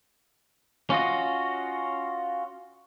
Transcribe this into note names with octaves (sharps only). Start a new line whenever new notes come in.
C#4 F4 F#4 D#5